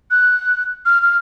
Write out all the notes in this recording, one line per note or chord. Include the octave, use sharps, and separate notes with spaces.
F#6
F6
F6